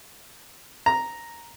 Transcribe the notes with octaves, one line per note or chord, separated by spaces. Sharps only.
A#5